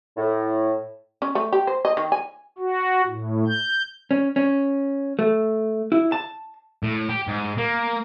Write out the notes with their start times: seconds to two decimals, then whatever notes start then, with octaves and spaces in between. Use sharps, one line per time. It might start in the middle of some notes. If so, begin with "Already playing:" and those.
0.17 A2
1.22 C#4
1.35 A3
1.53 G4
1.67 C5
1.85 D#5
1.97 D#3
2.12 G#5
2.59 F#4
3.07 A2
3.47 G6
4.11 C#4
4.36 C#4
5.19 A3
5.92 E4
6.12 A5
6.83 A2
7.10 G4
7.28 G#2
7.58 A#3